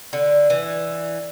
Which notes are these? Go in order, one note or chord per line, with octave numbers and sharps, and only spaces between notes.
D3
E3